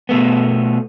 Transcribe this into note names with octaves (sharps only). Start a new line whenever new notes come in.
B2 A3 B3